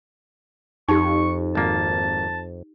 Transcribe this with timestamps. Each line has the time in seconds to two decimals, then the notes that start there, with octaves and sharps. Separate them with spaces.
0.89 F2 D#4 G4 C#6
1.55 G#1 A#3 A5